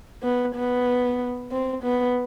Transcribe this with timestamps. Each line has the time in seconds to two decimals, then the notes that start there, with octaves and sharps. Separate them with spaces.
0.23 B3
0.55 B3
1.51 C4
1.83 B3